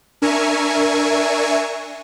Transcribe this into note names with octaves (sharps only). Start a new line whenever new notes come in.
D4 A#4 E5 G#5 A#5 C#6